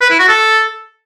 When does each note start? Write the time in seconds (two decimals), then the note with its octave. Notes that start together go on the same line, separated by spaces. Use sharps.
0.01 B4
0.10 E4
0.19 F#4
0.28 A4